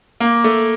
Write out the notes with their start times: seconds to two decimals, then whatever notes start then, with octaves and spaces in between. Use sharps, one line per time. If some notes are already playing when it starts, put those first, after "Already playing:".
0.20 A#3
0.44 A3